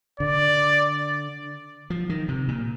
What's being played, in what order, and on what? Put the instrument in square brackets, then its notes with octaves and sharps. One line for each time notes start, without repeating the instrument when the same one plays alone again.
[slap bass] D3 [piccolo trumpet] D5
[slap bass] F3
D#3
C3
A#2